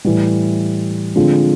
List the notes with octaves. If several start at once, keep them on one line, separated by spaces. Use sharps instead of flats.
A2 E3 G3
D3 F3 G#3 C4